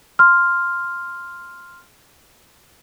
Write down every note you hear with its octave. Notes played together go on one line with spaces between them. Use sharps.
C6 F6